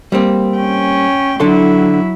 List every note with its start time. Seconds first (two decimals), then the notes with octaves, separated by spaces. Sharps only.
0.12 G3 A#3 C4
0.56 C#4 G5
1.40 D3 F#3 E4 A4 C6